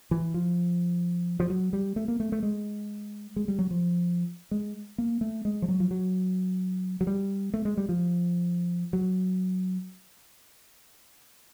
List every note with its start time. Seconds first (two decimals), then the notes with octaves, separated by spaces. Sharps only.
0.11 E3
0.34 F3
1.40 F3
1.50 F#3
1.73 G3
1.96 A3
2.08 A#3
2.20 A3
2.32 A3
2.43 G#3
3.36 G#3
3.48 G3
3.59 F#3
3.71 F3
4.51 G#3
4.98 A#3
5.21 A3
5.45 G#3
5.62 F3
5.68 F#3
5.80 F3
5.91 F#3
7.01 F#3
7.07 G3
7.54 A3
7.65 G#3
7.77 G3
7.89 F3
8.93 F#3